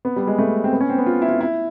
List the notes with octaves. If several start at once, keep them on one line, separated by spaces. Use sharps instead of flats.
B3
G3
G#3
A3
C4
B3
C#4
C4
B3
F4
E4
F4
E4